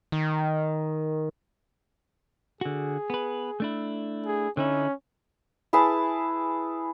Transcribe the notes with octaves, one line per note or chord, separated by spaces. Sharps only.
D#3
D3 F#4 G#4
B3 B4
A3 D4 E4
G#4
D3 C#4 D#4 E4
E4 G#4 B4 A5